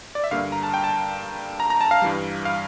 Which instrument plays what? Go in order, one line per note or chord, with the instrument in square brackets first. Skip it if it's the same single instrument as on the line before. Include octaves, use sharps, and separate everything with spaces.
[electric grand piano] D5
E5
G2 D3 G3 A#3 F5
A#5
A5
G5
A5
A#5
A#5
A5
F5
G2 E3 G3
F5